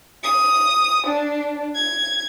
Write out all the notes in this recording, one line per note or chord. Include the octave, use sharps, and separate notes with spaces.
D#6
D4
G#6